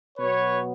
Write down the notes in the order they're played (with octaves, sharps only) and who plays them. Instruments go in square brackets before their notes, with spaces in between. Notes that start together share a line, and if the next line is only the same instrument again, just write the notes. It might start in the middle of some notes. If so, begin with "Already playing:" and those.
[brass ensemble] B2 F#3 B3 B4 C#5